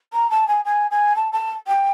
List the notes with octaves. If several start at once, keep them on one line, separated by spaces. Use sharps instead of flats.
A#5
A5
G#5
G#5
G#5
A5
A5
G5